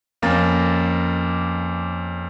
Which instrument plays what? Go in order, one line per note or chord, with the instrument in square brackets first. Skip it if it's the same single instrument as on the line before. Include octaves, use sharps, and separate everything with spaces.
[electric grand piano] F2 A#3 C#4 F5 A#5 A6